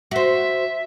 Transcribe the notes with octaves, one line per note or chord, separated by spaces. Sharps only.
F#4 C5 E5